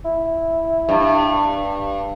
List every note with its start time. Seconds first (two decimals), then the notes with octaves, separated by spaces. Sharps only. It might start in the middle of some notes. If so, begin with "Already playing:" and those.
0.05 E4
0.89 G2